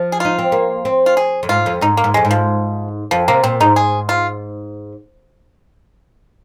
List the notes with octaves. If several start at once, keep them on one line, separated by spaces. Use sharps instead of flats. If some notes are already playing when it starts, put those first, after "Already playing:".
Already playing: F3
G#4
D#4 F4
C4
A#3
C4
F4
G#4
F2
G#2 F4
F2
G#2 D#4
A#3
G#2
F2 G#3
G#2
F3
F2 F3
C3 A#3
A#2 C4
G#2 D#4
G#4
F4